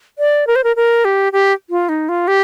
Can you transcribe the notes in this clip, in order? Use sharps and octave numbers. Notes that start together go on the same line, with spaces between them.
D5
A#4
C5
A#4
A#4
G4
G4
F4
D#4
F4
G4